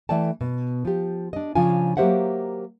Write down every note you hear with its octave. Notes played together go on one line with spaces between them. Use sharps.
E3 A3 D5 G5 A5
B2
F3 G4
D4 D#5
C#3 F3 C#4 D4 F4 G#5
F#3 A#3 G4 C5 E5 F#5